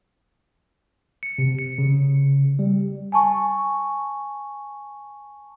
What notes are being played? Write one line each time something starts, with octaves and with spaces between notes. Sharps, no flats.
C#7
C3
C#7
C#3
G3
G#5 A5 C#6